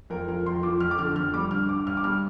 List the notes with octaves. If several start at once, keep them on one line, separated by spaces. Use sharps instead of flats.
F2 A#4
F3 A#4
F2 C6
F3 D6
F2 F6
D6
D3 F6
F2 F6
G3 D6
G2 F6
G2 D6
G2 F6
D6
G3 F6